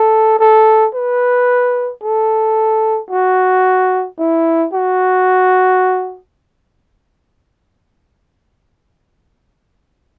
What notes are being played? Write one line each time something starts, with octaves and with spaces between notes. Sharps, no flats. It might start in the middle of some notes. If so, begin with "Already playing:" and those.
Already playing: A4
A4
B4
A4
F#4
E4
F#4